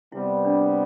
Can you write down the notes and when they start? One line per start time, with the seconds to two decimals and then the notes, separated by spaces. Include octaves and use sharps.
0.12 C3 G3 B3 E4
0.45 D4